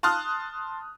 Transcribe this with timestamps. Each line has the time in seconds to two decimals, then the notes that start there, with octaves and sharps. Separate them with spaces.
0.03 A5 C6 D#6 F6 F#6